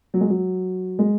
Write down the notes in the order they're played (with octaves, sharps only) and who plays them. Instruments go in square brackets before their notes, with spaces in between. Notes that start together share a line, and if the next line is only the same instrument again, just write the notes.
[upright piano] F#3
G#3
F#3
G#3